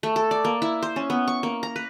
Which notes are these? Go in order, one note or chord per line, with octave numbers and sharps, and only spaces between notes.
A3
A4
D5
A#3
E4
C5
C#4
B3
C#6
A#3
A#5
B4